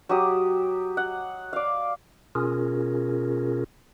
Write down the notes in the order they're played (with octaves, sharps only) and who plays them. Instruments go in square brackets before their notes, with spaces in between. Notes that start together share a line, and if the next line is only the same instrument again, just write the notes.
[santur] F#3 G4 D#6
F#5
D5 F5
[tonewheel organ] B2 C#4 F4 G#4 A#4